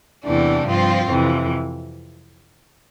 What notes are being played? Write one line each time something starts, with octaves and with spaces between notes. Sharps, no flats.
E2 C3 E3 A3 D4
G2 F3 C4 F4
F2 C3 E3